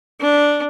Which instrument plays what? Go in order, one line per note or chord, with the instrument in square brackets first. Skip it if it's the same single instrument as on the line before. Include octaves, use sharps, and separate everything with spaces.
[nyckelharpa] D4